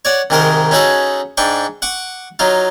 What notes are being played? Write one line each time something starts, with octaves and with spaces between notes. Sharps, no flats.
C#5 D5 F#5
C2 G#2 D#3 G#3 A#4 C5
C#4 D#4 F#4 G#4 A4 B4
G#2 D4 G5 C#6
F#5 C#6 D6
F#3 D#4 F4